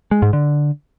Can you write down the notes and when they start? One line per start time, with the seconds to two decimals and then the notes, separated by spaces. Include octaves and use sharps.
0.11 G#3
0.22 G#2
0.33 D3